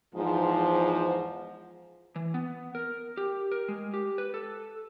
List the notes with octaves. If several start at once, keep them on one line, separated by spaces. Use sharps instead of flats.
E2 G#2 F3
E3
B3
A#4
G4
A#4
G#3
G4
B4
A4